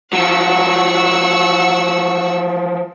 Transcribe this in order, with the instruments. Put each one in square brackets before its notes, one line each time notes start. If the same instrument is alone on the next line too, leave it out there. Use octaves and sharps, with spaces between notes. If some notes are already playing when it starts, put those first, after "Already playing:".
[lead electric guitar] F3 F#3 [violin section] F#5 C#6 E6